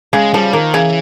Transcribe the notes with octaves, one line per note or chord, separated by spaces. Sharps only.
C#3 G#3
F3 G3
D#3 A#3
C#3 E3